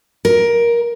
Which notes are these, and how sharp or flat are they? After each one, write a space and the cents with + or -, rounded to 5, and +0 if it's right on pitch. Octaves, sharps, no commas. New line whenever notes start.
A#4 +15